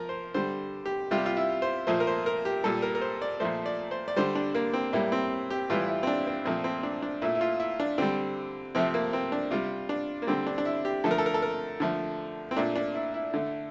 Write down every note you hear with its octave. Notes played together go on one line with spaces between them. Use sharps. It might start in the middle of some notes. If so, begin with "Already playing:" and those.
Already playing: F3 A#4
C5
D3 G3 C5
G4
C3 G3 F4
G4
F4
E4
C5
A#2 F3 A3 C5
A#4
C5
A#4
G4
A#2 G3 A4
A#4
A#4
C5
D5
A#2 F3 A3 C5
D5
C5
D5
D3 G3 C5
D4
A#3
C4
A2 G3 A#3
C4
G4
A2 E3 G3 F4
E4
C4
D4
C4
A#2 F3 A3 C4
C4
D4
D4
A#2 A3 E4
E4
F4
E4
D4
D3 G3 C4
C3 F3 A3 C4
A#3
C4
D4
C3 G3 F4
D4
A#3
D3 G3 C4
D4
D4
E4
G4
D3 F3 A3 A4
A#4
A4
A#4
A4
A#4
D3 F3 A3
C4
A#2 A3 D4
D4
E4
E4
D3 A3